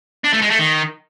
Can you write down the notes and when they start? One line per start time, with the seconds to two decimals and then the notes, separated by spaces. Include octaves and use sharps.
0.24 D4
0.33 A3
0.41 G#3
0.50 A3
0.59 D#3